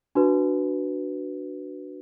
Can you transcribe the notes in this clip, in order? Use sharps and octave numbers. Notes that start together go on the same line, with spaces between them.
D4 F#4 B4